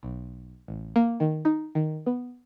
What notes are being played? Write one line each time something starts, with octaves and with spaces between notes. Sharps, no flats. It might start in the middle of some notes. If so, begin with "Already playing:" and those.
B1
A1
A#3
D#3
D#4
D#3
B3